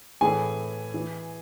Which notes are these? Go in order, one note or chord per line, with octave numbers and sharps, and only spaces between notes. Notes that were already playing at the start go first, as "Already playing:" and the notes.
A2 E3 G#4 G#5
E3